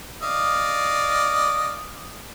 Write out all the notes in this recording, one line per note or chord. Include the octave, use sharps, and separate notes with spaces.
D5 D#5 F5